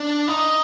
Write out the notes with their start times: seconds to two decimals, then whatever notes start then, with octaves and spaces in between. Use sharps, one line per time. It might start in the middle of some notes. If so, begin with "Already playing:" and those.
Already playing: D4
0.28 D#4